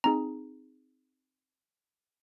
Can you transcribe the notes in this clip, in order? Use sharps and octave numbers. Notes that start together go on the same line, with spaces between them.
C4 D#4 G#4 A#5